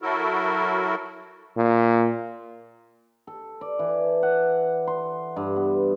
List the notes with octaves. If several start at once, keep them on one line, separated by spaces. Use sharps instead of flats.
F#3 E4 F#4 A4 A#4
A#2
A4
D5
E3
F#5
C6
G2
B3